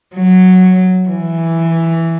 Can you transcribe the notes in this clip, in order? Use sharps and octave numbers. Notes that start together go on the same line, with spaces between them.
F#3
E3